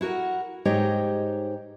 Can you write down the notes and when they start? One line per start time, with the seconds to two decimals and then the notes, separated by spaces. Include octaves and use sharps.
0.01 E4 F#4 A4 A#4 F#5
0.65 G#2 D#4 G4 C#5 D#5 G5